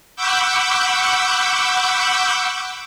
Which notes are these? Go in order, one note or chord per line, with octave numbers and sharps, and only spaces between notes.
F#5 B5 C#6 D6 E6 G6